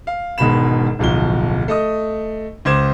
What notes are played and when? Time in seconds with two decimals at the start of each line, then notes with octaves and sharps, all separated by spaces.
0.07 F5
0.38 E1 G#2 B2 D#3 B5 E7
0.99 D1 B1 F3 G7
1.68 A3 D#5 D#6
2.65 C#2 C5 C6 D6 G#6 E7